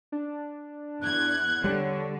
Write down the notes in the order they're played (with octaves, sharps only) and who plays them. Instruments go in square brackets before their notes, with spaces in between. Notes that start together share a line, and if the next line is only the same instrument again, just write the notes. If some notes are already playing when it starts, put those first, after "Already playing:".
[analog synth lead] D4
[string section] E2 G#6 [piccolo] F#6
[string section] D3 [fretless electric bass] G3 [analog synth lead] C#5